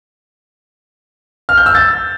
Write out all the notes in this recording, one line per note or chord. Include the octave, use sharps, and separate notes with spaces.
F6
G6
E6
A6